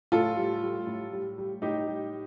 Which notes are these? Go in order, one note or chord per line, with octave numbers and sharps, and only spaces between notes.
A2 F4 A4
G3
G3
A2
G3
G3
A2 D#4 G4
G3